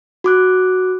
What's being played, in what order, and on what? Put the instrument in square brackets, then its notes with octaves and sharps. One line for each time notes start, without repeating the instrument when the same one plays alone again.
[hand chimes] F#4 D6 F#6